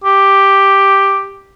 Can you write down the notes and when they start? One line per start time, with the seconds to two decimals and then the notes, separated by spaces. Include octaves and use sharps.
0.04 G4